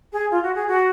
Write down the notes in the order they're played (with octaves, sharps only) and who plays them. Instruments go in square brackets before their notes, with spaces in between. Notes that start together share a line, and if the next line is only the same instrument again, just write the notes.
[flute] G#4
F4
F#4
G#4
F#4